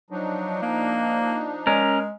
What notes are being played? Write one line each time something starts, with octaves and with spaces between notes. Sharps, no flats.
F3 F#3 D4 D#4
A#3
G#3 C#4 A#4